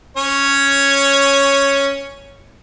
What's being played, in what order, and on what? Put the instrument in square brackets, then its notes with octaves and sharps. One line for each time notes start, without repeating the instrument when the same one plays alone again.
[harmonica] C#4 C#5